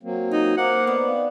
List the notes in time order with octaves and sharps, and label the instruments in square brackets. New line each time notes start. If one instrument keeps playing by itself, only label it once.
[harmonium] F#3 A#3 C4
[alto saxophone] D#4 [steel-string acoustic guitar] F4 [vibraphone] F#4
[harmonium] A#3 A#4 F5 [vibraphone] C5 D6 [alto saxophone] F#5
[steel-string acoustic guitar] G2 D#4 D5 [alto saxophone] B3
[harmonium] C4 [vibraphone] F5